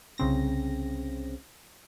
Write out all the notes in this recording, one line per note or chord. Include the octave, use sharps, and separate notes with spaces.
C2 C#3 C4 A#6